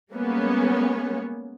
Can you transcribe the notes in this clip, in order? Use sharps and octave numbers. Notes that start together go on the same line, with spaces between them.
G3 G#3 A#3 B3 C#4 C#5